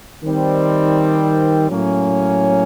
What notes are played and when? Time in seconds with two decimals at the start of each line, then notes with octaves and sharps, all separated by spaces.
0.23 D#3 G3 C4
1.70 A2 F#3 A#3 C#4